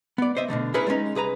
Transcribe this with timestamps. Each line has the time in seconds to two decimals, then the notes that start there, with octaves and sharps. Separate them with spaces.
0.18 B3 D5
0.37 C5 D#5 E5
0.48 B2 D3 D#3 A3
0.74 C#4 E4 G#4 A#4 B4 C#5
0.87 G3 G#3 A#3 C#4 D#4
1.15 C2 G#4 B4 A#5